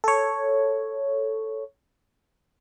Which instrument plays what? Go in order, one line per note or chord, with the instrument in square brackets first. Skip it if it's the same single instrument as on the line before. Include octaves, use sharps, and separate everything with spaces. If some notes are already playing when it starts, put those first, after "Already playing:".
[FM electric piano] A4 C#5